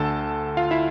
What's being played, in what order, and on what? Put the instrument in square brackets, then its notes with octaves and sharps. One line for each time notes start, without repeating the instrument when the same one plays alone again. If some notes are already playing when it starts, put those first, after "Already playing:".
Already playing: [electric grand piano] D2 D3 A4 A5
F4 F5
E4 E5